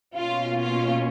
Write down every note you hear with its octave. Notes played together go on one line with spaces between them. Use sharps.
B2 A#3 C#4 F4
F4